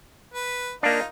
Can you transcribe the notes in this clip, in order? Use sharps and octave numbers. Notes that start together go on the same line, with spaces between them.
B4
A#3 D4 D#4 F4